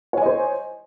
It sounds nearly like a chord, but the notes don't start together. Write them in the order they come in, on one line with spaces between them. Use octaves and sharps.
C#5 G#5 D#5 C5